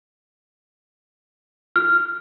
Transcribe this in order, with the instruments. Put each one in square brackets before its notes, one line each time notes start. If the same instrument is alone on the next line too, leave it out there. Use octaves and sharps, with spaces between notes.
[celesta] F6